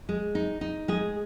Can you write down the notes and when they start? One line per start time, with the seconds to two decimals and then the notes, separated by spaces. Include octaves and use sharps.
0.09 G#3
0.35 D#4
0.61 D#4
0.88 G#3 G#4